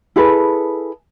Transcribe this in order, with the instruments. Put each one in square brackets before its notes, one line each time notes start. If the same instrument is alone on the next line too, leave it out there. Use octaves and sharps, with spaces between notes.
[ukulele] E4 G#4 A4 B4